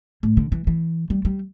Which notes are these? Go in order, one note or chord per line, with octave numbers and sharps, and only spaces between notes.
A2
D3
E3
E3
G3
G3